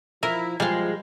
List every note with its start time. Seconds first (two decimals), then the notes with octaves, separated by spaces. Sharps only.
0.23 F3 E4 A#4
0.60 F3 G3 G#3 F5